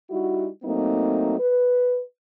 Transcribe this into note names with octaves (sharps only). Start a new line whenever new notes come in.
G3 D#4 E4 F#4
F#3 A3 A#3 C4 D#4
B4